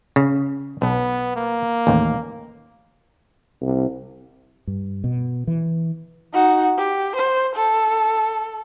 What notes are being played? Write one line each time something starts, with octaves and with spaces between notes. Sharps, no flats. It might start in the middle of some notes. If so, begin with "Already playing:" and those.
C#3
B1 B3
A#3
A1 D#2
C2
G2
B2
E3
D#4 F#4
G4
C5
A4